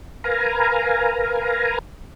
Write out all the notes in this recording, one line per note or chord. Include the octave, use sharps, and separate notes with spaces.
A#4 B4 F5 G#5 A#5